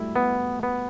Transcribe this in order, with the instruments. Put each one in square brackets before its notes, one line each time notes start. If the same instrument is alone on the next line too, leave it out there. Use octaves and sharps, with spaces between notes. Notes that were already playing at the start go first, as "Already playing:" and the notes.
Already playing: [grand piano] F#3 G3 A3 [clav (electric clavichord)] E4
[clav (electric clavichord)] B3
B3